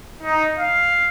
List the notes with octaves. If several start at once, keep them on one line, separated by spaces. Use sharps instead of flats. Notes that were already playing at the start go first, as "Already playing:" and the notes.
D#4
F5